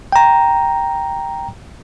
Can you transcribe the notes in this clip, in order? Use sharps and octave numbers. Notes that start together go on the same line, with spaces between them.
G5 A#5